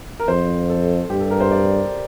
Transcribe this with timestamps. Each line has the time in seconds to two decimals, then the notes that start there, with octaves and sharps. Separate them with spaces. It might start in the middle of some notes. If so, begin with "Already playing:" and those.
0.20 A#4
0.28 F2 C5
0.70 A4
1.10 G2 G4
1.20 A4
1.31 A#4
1.40 C5
1.51 D5